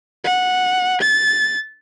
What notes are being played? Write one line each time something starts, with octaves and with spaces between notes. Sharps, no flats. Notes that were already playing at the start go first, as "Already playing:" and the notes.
F#5
A6